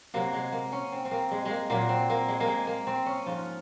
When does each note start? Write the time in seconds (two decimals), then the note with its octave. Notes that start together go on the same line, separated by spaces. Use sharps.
0.14 C3 F#3 A#3
0.33 G#3
0.52 A#3
0.72 C#4
0.92 C4
1.05 C4
1.11 A#3
1.31 G#3
1.45 G#3 A#3
1.70 A#2 F#3 A#3
1.89 C4
2.10 A#3
2.28 G#3
2.40 A#3
2.48 G#3
2.67 A#3
2.87 C4
3.06 C#4
3.26 G#2 F3 F4